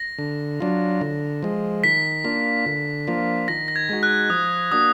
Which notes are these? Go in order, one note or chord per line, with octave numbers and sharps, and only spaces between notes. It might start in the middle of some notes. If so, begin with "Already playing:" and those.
Already playing: A#6
D3
F#3 D4 F4
D3
F3 G#3
D#3 B6
A#3 D4 F4
D3
F3 A#3 D4 F4
D#3 A#6
A#6
G#6
G#3 D#4 F#4
F#6
F3 D#6
A#3 D4 F#4 D#6